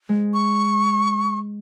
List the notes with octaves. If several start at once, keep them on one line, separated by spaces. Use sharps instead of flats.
G#3
C#6